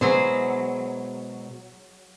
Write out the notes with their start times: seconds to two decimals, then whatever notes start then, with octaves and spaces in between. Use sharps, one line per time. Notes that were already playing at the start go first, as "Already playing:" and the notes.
0.01 B2 F#3 G#3 E4 G#4 C5